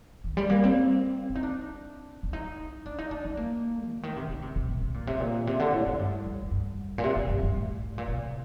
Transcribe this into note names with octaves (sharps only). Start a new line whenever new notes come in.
D#3
G3
A#3
C4
D4
D#4
D4
D4
D#4
D4
D#4
D4
C4
A#3
D3
D#3
C3
D3
C3
C3
C3
C3
A#2
C3
A#2
C3
D3
A2
A2
G2
F2
F2
G2
A#2
C3
C3
F2
G2
G2
A2
A#2
C3